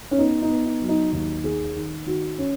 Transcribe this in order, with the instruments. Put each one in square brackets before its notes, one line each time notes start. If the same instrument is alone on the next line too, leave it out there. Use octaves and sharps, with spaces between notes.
[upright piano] C#4
B3 D#4
D#4
B3
D#4
F#3
D#4
D#2 D#4
D#3 G#4
D#3
D#3 F#4
C#4